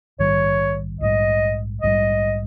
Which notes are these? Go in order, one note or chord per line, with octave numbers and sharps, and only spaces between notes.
A#1 G#2 D#3 G3 C#5
A#1 G#2 D#3 G3 D#5
A#1 G#2 D#3 G3 D#5